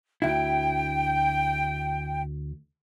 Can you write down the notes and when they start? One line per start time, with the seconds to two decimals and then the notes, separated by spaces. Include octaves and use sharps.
0.22 D2 E4 G5